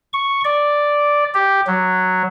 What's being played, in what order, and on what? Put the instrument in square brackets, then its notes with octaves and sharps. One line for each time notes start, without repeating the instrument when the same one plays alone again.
[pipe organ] C#6
D5
G4
F#3